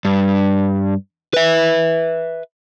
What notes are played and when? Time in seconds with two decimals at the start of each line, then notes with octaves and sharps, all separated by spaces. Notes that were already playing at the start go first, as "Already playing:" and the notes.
0.05 G2
1.34 B4 E5